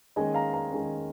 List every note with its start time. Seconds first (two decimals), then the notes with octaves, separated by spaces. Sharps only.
0.16 D#3 G#3 C#4 D#5 G#5
0.34 F5 A#5
0.53 F5 A#5
0.71 D#3 G#3 C#4